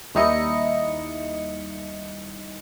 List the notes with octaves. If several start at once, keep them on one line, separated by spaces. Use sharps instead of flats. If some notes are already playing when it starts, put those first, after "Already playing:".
D#2 G3 D#4 E4 D#5 C#7